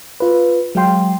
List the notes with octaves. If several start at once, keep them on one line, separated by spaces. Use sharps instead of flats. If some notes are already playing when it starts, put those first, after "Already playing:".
F4 B4
F#3 G#3 F5 G5 C6